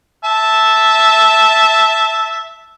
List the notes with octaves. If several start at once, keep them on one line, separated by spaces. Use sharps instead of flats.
E5 A5